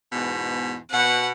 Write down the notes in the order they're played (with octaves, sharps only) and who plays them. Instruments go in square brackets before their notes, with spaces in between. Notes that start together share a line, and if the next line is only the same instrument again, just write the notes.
[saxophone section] E2 G#2 B2
[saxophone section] B2 [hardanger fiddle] F#5